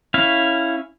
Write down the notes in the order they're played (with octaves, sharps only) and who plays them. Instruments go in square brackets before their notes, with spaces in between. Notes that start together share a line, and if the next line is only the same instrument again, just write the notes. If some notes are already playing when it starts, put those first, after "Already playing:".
[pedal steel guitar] C#4 E4 F5